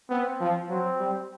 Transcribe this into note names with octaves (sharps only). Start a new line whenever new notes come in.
B3 C4
F3
F#3 C4
G3